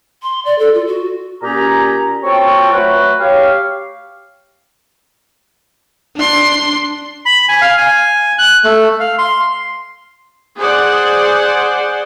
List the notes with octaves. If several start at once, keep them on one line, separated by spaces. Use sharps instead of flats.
C6
D5
A4
F4
F#4
A#2 C#4 G4 G#4 A#5
C4 F4 F#4 A4 C#5 G5
F#3 A3 F#4 B4
G4 C#5 F5
D4 C6
B5
G#5
F5
G#5
F#6
A3
F5
C6
G#4 C5 D5 F#5